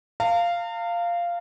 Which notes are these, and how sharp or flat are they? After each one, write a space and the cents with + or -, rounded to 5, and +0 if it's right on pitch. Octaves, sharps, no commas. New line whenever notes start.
F5 -10 A#5 -45